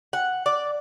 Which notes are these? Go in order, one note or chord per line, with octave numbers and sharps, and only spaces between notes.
F#5
D5